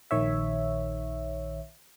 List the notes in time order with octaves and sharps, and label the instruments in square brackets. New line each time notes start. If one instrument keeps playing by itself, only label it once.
[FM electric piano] A#1 D#3 C#5 E5